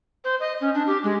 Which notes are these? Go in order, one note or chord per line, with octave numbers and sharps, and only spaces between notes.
C5
D#5
C#4
D4
G4
G#3